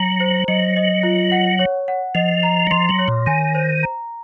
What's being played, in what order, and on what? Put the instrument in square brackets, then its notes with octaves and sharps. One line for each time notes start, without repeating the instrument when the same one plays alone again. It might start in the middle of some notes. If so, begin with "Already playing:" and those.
Already playing: [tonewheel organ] F#3 [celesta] A#5
[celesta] C5
[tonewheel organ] F#3 [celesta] D#5
[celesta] D#5
F4
F#5
C#5
F#5
[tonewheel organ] F3 [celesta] D#5
[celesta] A#5
[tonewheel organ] F#3
[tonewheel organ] F3 [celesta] C6
[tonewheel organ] F#3
[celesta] C#5
[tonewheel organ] A#2
[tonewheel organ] D#3 [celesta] G#5
[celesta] C5
A#5